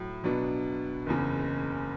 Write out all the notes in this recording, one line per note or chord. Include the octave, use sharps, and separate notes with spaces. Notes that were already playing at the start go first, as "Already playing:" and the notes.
Already playing: A2 F#3
B2 F#3 B3 D4
F#1 E2 C#3